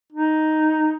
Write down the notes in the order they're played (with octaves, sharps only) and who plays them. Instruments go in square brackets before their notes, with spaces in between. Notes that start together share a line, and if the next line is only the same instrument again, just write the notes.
[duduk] D#4